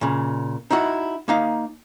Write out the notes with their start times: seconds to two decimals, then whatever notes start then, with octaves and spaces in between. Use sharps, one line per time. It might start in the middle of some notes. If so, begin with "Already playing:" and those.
0.01 A#2 C#3
0.71 D#4 E4 F#4 F#5
1.28 A#3 D#4 F5